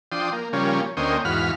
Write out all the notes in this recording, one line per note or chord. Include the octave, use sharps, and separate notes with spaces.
F3 D4 G5 C6 D#6
A#3
C#3 F3 G3 A#3 C#4
D2 A#3 C#4 C5 D#5 G5
E2 G#2 F#4 F5 B5 F6